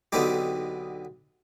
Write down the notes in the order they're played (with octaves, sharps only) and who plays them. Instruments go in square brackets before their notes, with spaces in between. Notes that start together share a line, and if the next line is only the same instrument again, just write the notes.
[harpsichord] B1 D3 B3 C4 D#4 G4